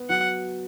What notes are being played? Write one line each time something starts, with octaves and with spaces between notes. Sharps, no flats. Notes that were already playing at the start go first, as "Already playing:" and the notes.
Already playing: B3
F#3 F#5